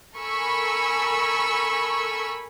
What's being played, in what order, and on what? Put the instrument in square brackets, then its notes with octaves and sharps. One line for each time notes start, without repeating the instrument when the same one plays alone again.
[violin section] A4 A#4 G#5 B5 C#6 E6